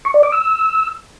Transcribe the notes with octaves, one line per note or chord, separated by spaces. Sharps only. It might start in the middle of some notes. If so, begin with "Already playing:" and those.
C#6
D5
D6
E6